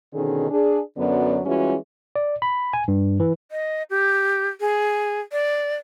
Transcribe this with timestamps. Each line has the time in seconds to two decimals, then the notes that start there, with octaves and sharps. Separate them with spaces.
0.13 B2 D3 D#3 C#4 G#4 A4
0.49 D4 G#4
0.97 F#2 D3 F#3 B3 C#4 D5
1.45 E3 G3 G#3 C#4 F4 F#4
2.16 D5
2.42 B5
2.73 G#5
2.88 G2
3.20 E3
3.51 D#5
3.90 G4
4.61 G#4
5.32 D5